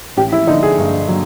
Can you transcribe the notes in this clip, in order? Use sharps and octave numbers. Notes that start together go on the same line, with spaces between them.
A1 G4
E4
D3 D#4
G#4
G2
F#3